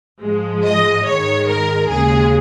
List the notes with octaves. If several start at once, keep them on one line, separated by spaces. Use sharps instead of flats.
G#2 F3 G#3
D#5
G#2 D#3 G#3 C#5
A#4
D#2 C#3 G#3 G#4